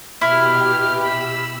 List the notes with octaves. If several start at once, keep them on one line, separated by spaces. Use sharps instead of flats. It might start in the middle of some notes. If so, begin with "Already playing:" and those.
B2 E4 G4 F6
B5 E6